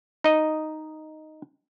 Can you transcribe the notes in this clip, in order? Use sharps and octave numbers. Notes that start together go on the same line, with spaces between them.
D#4 D#5